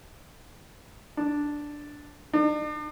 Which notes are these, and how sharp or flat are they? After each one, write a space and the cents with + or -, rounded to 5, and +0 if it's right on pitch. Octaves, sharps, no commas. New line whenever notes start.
D4 +0
D4 +45